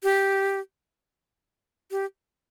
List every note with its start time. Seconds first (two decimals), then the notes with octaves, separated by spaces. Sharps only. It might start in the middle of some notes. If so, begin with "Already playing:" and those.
0.03 G4
1.91 G4